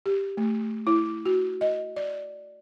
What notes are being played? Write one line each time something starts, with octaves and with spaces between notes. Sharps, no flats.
G4
A3
E4
F#4
D#5
D5